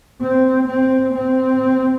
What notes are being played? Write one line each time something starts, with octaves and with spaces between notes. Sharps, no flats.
C4
C4
C4